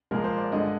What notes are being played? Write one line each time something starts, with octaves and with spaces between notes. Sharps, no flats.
A#2 F3 G#3 A#4
C5
D5
G2 D3 G#3 D#5